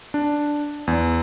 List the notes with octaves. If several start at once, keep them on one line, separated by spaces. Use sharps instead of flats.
D4
E2